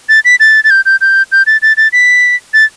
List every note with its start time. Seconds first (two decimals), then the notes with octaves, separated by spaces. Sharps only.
0.09 A6
0.25 B6
0.40 A6
0.64 A6
0.70 G6
0.85 G6
1.01 G6
1.32 G6
1.46 A6
1.62 A6
1.77 A6
1.93 B6
2.54 A6